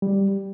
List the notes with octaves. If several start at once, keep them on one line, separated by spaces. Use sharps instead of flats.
G3